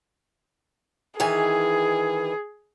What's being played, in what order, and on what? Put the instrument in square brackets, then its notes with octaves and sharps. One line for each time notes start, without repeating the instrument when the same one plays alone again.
[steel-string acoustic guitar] D#3 E3 G#5 [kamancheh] G#4